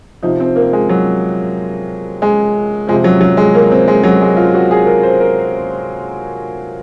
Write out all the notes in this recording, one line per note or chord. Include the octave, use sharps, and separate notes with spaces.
C3 F3 D#4
C4
A#3
G#3
F#3
G#3
C3 F3 G#3
F#3
F#3
G#3
A#3
C4
G#3
F#3
G#3
F4
F#4
G#4
A#4
C5
A#4